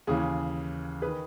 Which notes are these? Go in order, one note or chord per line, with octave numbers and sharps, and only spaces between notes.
D#2 C#3 E3 G#4
D#3 G#4 B4